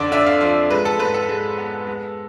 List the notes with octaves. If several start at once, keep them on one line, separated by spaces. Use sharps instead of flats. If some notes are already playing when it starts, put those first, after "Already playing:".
Already playing: F2 D3 D5
D3 E5
F5
F3 F5
G#3 B4
A4
G#2 B4
A4
G#3
B3
G#3